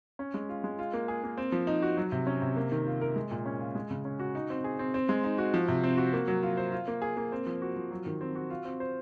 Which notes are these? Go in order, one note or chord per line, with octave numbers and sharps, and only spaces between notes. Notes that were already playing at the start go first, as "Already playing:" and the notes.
C#4
G#3
F4
G#3
F4
A#3
G#4
A#3
C4
F3
D#4
F#4
F#3
C3
C#4
C3
A#3
D#3
F4
A#4
G#3
A#2
C#4
F4
G#3
C#3
C#4
F#4
D#4
C4
G#4
C4
C4
G#3
D#4
F#4
F3
C3
C4
F#4
A#3
F#3
F4
C5
F4
A#3
G#4
A#3
C4
F3
F#4
F3
F#3
D#3
C4
F#4
F4
C4
C5